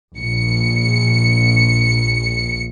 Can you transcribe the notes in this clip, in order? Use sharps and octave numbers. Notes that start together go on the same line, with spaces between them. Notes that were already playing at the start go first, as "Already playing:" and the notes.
A#1 C#7